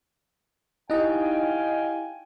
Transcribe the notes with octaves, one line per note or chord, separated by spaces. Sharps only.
D#4 E4 G4 D#5 F5 G5 G#5